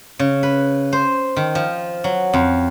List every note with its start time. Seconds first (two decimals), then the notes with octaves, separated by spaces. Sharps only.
0.19 C#3
0.43 B4
0.93 C5
1.37 D#3
1.55 F3
2.04 F#3
2.34 F2